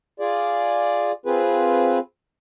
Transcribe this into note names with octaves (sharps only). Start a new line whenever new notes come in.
F4 G#4 D5
C4 F4 G#4 B4